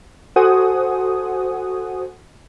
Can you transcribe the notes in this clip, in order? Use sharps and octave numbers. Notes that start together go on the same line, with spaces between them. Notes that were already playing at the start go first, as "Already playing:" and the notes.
F#4 A4 C5 F#5 G#5 D#6